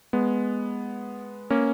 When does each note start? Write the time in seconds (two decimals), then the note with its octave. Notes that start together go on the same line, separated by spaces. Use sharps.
0.13 G#3 B3
1.50 A#3 C#4